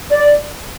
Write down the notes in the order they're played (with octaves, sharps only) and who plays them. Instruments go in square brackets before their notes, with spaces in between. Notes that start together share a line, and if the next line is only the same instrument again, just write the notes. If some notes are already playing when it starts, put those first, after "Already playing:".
[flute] D5